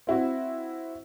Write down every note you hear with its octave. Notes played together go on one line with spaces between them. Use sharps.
C4 E4 F#4